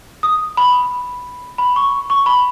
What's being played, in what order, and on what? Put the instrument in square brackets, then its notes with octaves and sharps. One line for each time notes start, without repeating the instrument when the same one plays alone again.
[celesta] D#6
B5
B5
C#6
C#6
B5